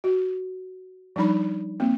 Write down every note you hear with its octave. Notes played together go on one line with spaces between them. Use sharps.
F#4
F3 G3 D4 D#4 B5
A#3 C4